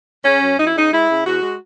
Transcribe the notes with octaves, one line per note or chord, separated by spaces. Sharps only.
C#3 C#4
F#2
F#2 D#4
E4
C#3 D#4
G#3 E4
C#3
E2 F#4
G#3